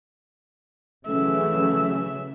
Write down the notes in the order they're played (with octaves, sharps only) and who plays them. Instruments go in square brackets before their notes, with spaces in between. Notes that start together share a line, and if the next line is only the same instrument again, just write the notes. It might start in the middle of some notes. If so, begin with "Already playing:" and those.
[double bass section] C#3 E3 F#3 [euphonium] A3 [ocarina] C#4 [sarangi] E5